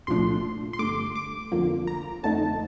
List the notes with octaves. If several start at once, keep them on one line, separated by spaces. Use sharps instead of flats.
C2 A#2 F3 A3 D4 C6
C6
G2 D3 A3 D6
D6
F2 D3 F3 A#3
A#5
F2 D3 A3 D#4 A5